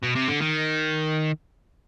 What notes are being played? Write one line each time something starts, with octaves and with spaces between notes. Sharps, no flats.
B2
C3
D3
D#3